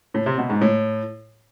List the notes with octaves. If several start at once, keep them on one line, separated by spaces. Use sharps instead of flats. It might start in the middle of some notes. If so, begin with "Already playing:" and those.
A2
C3
B2
G#2
A2